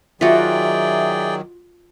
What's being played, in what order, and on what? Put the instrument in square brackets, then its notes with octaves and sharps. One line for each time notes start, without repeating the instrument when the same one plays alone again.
[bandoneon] D#3 F#3 [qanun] F4 F#4 [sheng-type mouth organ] G#4 D5 G5 [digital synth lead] E5